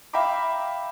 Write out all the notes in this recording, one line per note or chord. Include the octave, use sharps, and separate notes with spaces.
E5 F5 G5 A#5 B5 D6